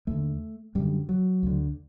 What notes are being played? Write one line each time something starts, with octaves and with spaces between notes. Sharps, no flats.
D#2 D3 A3
F#2 D3 G3
F#3
D2 D3